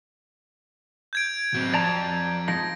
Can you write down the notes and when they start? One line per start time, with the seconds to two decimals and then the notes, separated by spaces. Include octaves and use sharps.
1.13 G6 G#6 D7
1.55 F#3 C4
1.74 F2 D5 A5 A#5
2.48 F3 G#3 D#4 A#6